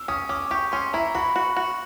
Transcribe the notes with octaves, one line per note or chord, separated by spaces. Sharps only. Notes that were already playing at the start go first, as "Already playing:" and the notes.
Already playing: E6
C#4 D#6
C#4 D6
G4 C#6
C#4 C6
E4 A#5
F#4 B5
F#4
F#4